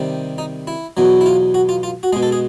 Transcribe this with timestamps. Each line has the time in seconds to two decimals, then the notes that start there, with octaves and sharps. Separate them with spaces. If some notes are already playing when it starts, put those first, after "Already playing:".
Already playing: C3 D#3 G3
0.38 D#4
0.67 E4
0.97 E2 B2 F#3
1.21 E4
1.26 F4
1.54 F#4
1.69 F4
1.83 F4
2.03 F#4
2.13 G#3 G#4
2.16 B2
2.23 A4
2.32 G#4